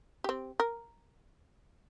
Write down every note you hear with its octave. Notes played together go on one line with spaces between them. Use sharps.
C4 G4
A#4